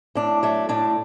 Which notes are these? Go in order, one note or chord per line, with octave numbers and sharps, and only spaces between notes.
A2 D4
F#3 A3
A2 D4